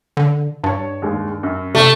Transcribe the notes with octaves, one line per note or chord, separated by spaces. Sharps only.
D3
G2 C#5 A5
D#2 G#3
F#2
C3 A3